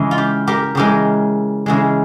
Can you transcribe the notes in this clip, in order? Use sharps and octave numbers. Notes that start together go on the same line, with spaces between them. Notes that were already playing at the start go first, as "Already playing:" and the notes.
Already playing: C#3 E3 G#3
F4
G4
G4 A#4
C#3 E3 G#3 G4 A#4
C#3 E3 G#3